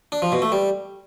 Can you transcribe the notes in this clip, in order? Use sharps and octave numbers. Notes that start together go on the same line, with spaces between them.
D4
F3
B2
A3
G3